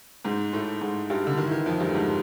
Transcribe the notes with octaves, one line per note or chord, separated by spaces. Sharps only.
G#2 G#3
A2 A3
G#2 G#3
G2 G3
D3
D#3
E3
D#3
F2 F3
G2 G3
A3
G#2 G#3